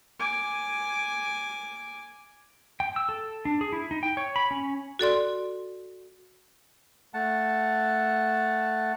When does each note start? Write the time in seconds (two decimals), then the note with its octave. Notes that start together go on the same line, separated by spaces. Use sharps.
0.19 G#5 D6
2.80 G5
2.96 E6
3.09 A4
3.45 D4
3.61 G#4
3.73 E4
3.91 D#4
4.03 G5
4.17 C#5
4.36 B5
4.51 C#4
4.99 F#4 A4 D5 C6
7.14 A3 F#5 A5